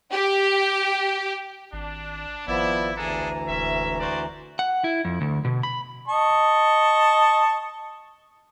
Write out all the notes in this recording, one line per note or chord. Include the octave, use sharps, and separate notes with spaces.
G4
G#1 D4
G#1 F3 B3 E4 D5
D2 E3 D4 G#4 A4 A#5
E1 C#4 E5
F#4 C5 D5
F#5
E4
F2
D2
B2
B5
D#5 A5 C#6